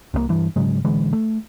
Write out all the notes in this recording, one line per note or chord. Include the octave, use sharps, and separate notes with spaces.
C2 E3 A#3
G2 E3
G#2 C#3 F#3 G#3
A1 D3 E3 G#3
A3